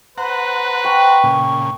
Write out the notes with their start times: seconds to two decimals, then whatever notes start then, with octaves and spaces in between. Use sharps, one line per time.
0.18 B4 C5 F#5 A#5
0.85 G5 A5 C#6
1.24 A#2 C#3